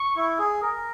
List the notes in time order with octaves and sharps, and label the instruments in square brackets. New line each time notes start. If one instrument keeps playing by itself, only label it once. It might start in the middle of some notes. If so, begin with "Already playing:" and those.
Already playing: [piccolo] C#6
[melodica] E4
G#4
A#4